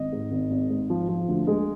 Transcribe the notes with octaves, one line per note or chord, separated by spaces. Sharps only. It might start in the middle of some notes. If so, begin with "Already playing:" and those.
Already playing: G#1 D#5
G#2
G#1
G#1
G#2
F3
F3
D2
G#3